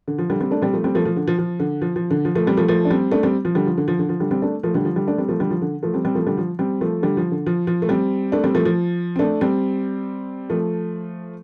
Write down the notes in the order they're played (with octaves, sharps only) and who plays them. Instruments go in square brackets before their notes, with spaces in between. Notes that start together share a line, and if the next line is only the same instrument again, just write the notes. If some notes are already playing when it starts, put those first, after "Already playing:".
[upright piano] D3
F3
D3 G3
G3 C4
A3 D4
G3 C4
F3 A3
G3 C4
F3 A3
F3
D3
F3
F3
D3
F3
F3
D3
F3
F3 A3
G3 C4
F3 A3
F3 A3
D4
G3 C4
A3 D4
G3 C4
F3
D3 G3
F3
D3
F3
D3
F3
D3 G3
G3 C4
A3 D4
F3 A3
D3 G3
F3
D3 G3
A3 D4
G3 C4
F3 A3
D3 G3
F3
D3
F3 A3
G3 C4
G3 C4
F3 A3
D3 G3
F3
G3 C4
F3 A3
D3 G3
F3
D3
F3
F3
A3
G3 C4
A3 D4
G3 C4
F3 A3
F3
C4
A3 D4
G3 C4
F3 A3